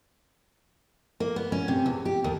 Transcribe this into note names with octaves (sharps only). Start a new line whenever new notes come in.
A#3
B3
C#4
C3
E2
G4
D#2